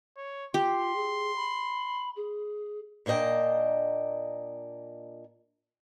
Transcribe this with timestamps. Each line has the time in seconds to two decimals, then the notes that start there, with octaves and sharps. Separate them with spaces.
0.17 C#5
0.54 F4 G4 C6
0.95 G#4
1.36 B5
2.16 G#4
3.06 A#2 A#3 D4 D#5 G5